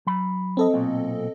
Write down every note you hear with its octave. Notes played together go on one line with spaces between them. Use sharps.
F#3 B5
C4 A4 D#5
B1 A#2